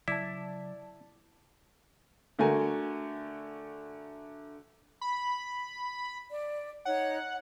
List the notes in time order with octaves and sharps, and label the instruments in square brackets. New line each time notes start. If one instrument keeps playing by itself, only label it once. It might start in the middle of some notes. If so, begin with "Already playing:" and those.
[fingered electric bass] C#3 F#3 [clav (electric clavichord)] E4 [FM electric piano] D5 A5
[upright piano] D3 A3 F#4 A#4 G#5
[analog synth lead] B5
[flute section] D5
[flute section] D#4 C#5 [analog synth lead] F#5